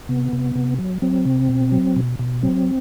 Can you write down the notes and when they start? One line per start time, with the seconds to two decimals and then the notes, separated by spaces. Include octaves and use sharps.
0.09 C3 B3
0.33 C3
0.56 C3
0.79 F#3
1.02 F#3 C4
1.25 C3
1.49 B2
1.72 F#3
1.96 B2
2.19 B2
2.42 F#3 C4